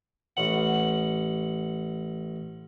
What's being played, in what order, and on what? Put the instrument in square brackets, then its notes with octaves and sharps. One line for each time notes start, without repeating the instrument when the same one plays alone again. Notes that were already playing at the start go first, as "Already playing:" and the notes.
[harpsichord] A1 F#5